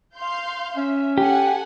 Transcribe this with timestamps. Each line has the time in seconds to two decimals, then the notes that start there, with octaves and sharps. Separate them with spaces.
0.17 F5 C6 G6
0.77 C#4 E5
1.18 G4 A4 F#5 G#5